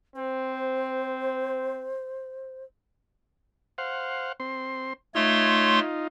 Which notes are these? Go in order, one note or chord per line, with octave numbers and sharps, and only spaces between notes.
C4 C5
C5 F5 F#5
C4 C6
A3 D#4 F4 C#5 C6